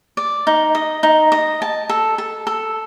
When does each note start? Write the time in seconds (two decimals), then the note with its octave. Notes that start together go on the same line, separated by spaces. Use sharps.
0.17 D5
0.47 D#4
0.75 D#5
1.03 D#4
1.32 D#5
1.62 A5
1.89 A4
2.18 A4
2.47 A4